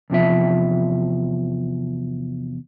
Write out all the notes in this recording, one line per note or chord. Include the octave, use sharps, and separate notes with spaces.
E2 C3 F3 E5